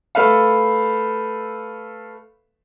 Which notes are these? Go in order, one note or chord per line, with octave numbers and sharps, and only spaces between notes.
A3 A4 B4 E5 F5